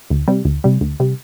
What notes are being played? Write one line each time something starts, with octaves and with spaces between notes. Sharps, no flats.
D2
C3 G3
D2
C3 G3
D2
C3 G3